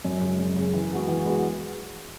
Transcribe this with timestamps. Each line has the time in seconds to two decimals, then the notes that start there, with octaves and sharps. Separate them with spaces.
0.05 F#2
0.21 C#3 G#3
0.39 F#2
0.56 C#3 G#3
0.73 E3
0.91 G#3 B3 F#4
1.08 E3
1.25 G#3 B3 F#4